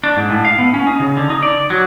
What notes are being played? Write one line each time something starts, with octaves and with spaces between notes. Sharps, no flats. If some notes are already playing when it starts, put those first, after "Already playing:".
D4
G#2
A2
F5
B3
C#4
D#4
C#3
D3
D#4
D5
F#3